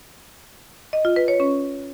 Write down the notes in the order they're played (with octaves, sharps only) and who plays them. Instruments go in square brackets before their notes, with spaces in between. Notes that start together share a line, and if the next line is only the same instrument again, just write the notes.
[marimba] D#5
F4
B4
C#5
C#4